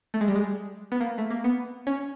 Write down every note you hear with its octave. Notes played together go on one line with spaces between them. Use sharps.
A3
G#3
G3
G#3
B3
A#3
A3
A#3
B3
C#4